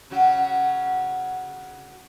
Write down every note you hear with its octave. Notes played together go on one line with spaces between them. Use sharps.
C#3 F#3 F#4